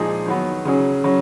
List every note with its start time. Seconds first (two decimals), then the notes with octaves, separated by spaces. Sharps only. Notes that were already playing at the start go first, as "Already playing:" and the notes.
Already playing: A#2 F3 G#3 D#4 G#4
0.26 D#3 F#3 B3
0.65 C#3 F#3 C#4 G#4
1.04 C#3 F#3 C#4